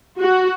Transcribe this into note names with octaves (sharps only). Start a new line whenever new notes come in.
F#4